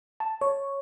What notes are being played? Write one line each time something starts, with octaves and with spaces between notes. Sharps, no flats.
A5
C#5